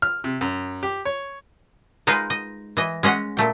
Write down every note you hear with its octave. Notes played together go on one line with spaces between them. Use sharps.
F6
C3
F#2
G4
C#5
G#3 D#4 F4 B4 D#5
D#5
E3 D#5
G#3 C#4 D#5 F#5
A#2 A3 G5